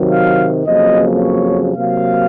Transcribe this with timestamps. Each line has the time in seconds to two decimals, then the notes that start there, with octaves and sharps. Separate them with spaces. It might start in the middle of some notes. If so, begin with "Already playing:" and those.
Already playing: C3 D#3 F#3
0.10 F5
0.64 F2 C#3 F#3 A#3 D#5
1.19 C#5
1.75 C3 F#3 A#3 F5